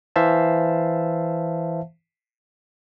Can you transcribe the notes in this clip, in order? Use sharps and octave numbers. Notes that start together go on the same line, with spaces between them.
E3 C5 E5 F5 A5